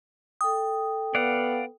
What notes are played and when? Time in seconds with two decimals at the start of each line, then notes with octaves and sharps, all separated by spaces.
0.41 A4 G5 D#6
1.15 B3 D5 F5 F#5